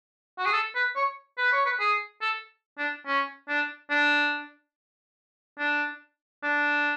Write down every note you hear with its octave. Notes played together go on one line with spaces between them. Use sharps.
F#4
G#4
A4
B4
C#5
B4
C#5
B4
G#4
A4
D4
C#4
D4
D4
D4
D4